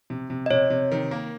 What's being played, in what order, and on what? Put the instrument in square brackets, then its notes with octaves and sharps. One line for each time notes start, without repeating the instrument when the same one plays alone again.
[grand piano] C3
C3
[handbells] D#5
[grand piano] C3 [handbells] C#5
[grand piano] C3
D#3
A#3